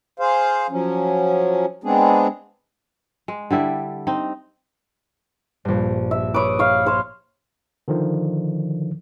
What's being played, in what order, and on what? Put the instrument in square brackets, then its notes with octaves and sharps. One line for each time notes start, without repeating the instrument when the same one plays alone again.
[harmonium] G#4 C5 F5
F3 F#3 C#4
G#3 B3 C4 D4 G#4
[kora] G#3
D3 G3 E4 D5
C4 D#4
[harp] A#1 G2
[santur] E5
[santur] B4 C#5 [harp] D6 D#6 D7
[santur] C#5 F5
C5 C#5 F5
[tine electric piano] D3 D#3 F3